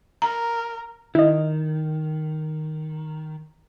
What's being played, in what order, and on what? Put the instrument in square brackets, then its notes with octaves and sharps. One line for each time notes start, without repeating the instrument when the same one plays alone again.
[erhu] A#4 [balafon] A#5
[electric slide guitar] D#3 [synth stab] E4 D#5